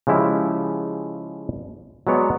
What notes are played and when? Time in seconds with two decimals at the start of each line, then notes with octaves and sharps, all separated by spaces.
0.07 C#3 F3 G#3 E4 G4
2.07 F#3 G#3 B3 C#5 D5